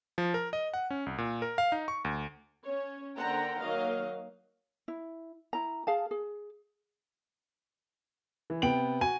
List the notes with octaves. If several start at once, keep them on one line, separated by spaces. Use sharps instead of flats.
F3
A#4
D#5
F#5
C#4
C2
A#2
A#4
F5
D#4
C#6
D2
C#4 C#5
D3 A#3 C5 F#5 G5 A#5
D#3 F#3 A#3 D#5 F5
E4
E4 A#5
G#4 F5 A5
G#4
E3
C3 B3 G5 D7 F#7
F#4 G#5 D#7